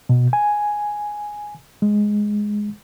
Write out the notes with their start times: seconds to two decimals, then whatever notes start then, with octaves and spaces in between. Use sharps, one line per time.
0.09 B2
0.33 G#5
1.82 G#3